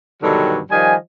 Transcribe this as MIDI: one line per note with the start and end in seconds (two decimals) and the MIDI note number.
0.23 0.59 43
0.23 0.59 47
0.23 0.59 50
0.23 0.59 51
0.23 0.59 54
0.71 0.94 51
0.71 0.94 53
0.71 0.94 55
0.71 0.94 75
0.71 0.94 80